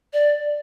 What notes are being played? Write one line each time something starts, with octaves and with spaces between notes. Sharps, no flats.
D5